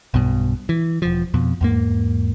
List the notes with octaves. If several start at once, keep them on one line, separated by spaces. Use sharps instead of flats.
B1 G2 B2
E3
E1 F3
F2 B2
E2 G#2 A#3